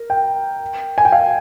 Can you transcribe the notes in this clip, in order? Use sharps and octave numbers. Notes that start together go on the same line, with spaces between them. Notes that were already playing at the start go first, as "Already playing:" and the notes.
Already playing: A#4
G5
G#5
G5
F5